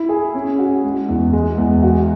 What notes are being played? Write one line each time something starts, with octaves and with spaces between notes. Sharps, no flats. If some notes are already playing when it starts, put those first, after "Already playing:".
Already playing: E4
G#4
C#4
F#4
G#3
E2
G#3
E2
F#4